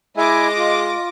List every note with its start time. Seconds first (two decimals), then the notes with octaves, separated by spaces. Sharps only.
0.17 G#3 E4 D#5 E5 G#5 D6 A#6
0.57 F4